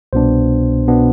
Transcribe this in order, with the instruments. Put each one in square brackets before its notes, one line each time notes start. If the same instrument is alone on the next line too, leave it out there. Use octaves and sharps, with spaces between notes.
[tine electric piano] C2 B2 B3 D4 C5
B2 B3 D4